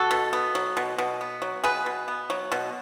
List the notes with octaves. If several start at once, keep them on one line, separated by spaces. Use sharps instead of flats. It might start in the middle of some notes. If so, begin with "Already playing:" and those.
Already playing: F#4 A4
B2
B3
F#3
B2
B2
B3
F#3
B2 G#4 B4
B2
B3
F#3
B2